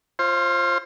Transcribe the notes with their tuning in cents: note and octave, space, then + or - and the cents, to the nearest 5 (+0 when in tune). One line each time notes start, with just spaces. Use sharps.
F4 -15 C5 +25